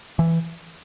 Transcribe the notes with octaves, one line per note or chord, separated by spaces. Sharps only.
E3